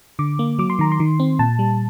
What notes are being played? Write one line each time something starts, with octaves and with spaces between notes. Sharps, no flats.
D3 D6
A#3
F#3 D6
C6
D#3 A#5
C6
D#3
C4
A#2 A5
G3